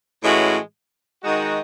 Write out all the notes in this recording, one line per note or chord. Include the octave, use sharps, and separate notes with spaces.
A2 E3 G#3 C#4 F#4
D#3 G#3 D#4 F#4